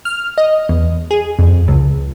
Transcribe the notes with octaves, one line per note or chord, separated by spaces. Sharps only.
F6
D#5
E2
G#4
F2
C#2